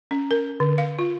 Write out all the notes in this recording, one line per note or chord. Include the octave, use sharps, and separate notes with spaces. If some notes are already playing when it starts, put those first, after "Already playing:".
C#4
A#4
D3
F5
F4